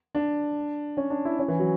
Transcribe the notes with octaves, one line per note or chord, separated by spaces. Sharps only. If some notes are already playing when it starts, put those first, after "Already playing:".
D4
C#4
D4
E4
C#4
E3
F#3